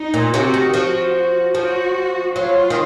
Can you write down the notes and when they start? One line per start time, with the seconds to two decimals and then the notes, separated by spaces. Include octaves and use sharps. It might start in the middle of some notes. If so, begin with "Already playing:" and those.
Already playing: D#4
0.14 A#2
0.34 C3 F#4
0.54 D#3
0.73 F3 F#4
1.15 F#4
1.55 F3 F#4
2.36 F#3 F4
2.70 D#3